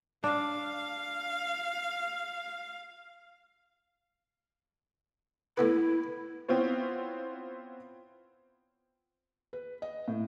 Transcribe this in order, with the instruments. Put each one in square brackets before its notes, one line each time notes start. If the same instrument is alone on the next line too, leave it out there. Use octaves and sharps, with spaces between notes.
[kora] D4 [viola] F5
[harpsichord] A2 B3 B4 [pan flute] E4
[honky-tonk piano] B3 C4 E4 F4 C5 C#5
[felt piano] B4
D#5
A2